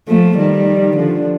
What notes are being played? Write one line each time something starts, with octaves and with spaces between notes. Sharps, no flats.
F3 A3
D#3 G3
D3 F3